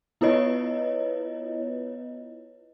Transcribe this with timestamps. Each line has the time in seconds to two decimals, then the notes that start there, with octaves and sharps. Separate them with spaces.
0.21 B3 E4 F4 B4 C#5 D#5